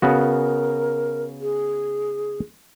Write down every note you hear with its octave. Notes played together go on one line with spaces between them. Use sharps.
C#3 B3 F#4 A#4
G#4